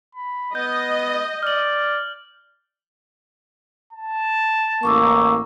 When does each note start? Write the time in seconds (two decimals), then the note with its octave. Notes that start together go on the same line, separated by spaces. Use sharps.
0.15 B5
0.55 B3 D#5 G6
1.43 D5 F6 F#7
3.93 A5
4.83 A1 A#3 C#6 D6 E6